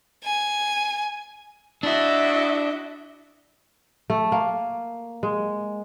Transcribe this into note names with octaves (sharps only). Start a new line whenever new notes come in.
G#5
D4 E4 F#4 D#5 E5
A3
A#3
G#3